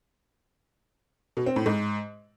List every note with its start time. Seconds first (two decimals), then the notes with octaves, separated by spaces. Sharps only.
1.37 B2
1.46 C4
1.56 A2
1.66 G#2